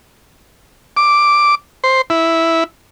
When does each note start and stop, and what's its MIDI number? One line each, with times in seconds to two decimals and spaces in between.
0.97 1.55 86
1.84 2.01 72
2.10 2.64 64